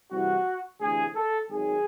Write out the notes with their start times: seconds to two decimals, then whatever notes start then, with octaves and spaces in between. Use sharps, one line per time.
0.11 C2 C3 E3 F#4
0.80 D2 C3 E3 G#4
1.15 A4
1.50 G#1 F#2 D#3 G#4